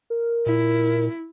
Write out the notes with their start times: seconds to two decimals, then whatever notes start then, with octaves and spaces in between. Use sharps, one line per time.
0.10 A#4
0.46 A#2 E4